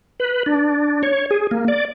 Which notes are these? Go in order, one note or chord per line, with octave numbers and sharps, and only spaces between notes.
B4
D4
C#5
G#4
A#3
D5